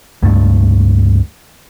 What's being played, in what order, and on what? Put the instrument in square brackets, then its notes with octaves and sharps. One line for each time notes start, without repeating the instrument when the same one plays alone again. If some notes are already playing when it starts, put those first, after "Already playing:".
[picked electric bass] C#2 G2 A3